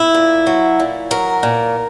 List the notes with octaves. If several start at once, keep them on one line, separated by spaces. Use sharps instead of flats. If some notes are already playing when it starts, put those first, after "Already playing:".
Already playing: E4
A#2
F#3
A#2
F#3 A#4
A#2